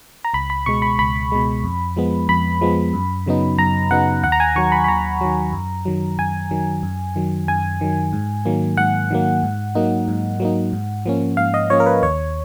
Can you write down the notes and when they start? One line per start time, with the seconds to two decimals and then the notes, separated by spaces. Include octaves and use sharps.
0.24 A#5
0.34 C#2 B5
0.50 B5
0.66 B2 G#3 C#6
0.82 B5
0.99 C#2 B5
1.32 B2 G#3
1.64 F2
1.96 F3 G#3 B3
2.29 F2 B5
2.61 F3 G#3 B3
2.93 F#2
3.26 C#3 F#3 B3 D#4
3.58 F#2 A#5
3.91 C#3 F#3 B3 D#4 F#5
4.23 D#2 F#5
4.32 A#5
4.40 G#5
4.56 D#3 F#3 C#6
4.72 B5
4.84 B5
4.88 D#2 A#5
5.21 D#3 F#3
5.53 F#2
5.85 D#3 F#3
6.19 F#2 G#5
6.51 D#3 F#3
6.83 F#2
7.16 D#3 F#3
7.48 F#2 G#5
7.81 D#3 F#3
8.13 G#2
8.45 D#3 F#3 A#3
8.77 G#2 F#5
9.10 D#3 F#3 A#3
9.43 G#2
9.75 F#3 A#3 D#4
10.08 G#2
10.40 F#3 A#3 D#4
10.73 G#2
11.06 F3 A#3 C#4
11.37 G#2 F5
11.54 D#5
11.70 F3 A#3 C#4 C#5
11.80 A#4
11.86 B4
12.02 D#2 C#5